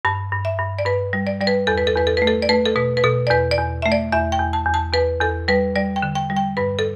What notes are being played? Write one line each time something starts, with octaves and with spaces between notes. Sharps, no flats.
G2 A5
G2
E5
G2
D5
G2 B4
G3
D5
G3 D5
B4
E2 A4
B4
A4
E2 B4
A4
A3 B4
A4
D5
A3 B4
A4
B2 B4
B4
B2 A4
D5
E2 B4
D5
E2
A3 E5
D5
E2 E5
G5
E2
A5
E2
A5
E2 B4
E2 A4
G3 B4
G3 D5
G5
D3
G5
G3
G5
G2 B4
A4